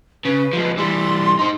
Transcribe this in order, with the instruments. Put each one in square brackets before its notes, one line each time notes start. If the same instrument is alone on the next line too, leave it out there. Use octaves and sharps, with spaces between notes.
[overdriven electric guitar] C#3 [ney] B4
[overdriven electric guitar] F3 G#3
[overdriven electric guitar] E3 G3 [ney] C6
[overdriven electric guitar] D#4 C5